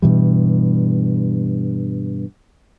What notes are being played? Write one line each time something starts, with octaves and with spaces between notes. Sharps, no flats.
G2 B2 E3 G3